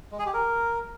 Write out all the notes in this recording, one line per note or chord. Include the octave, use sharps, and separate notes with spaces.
G#3
G#4
G4
A#4